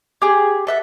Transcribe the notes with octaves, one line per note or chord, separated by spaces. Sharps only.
G4 G#4
A4 E5 F#5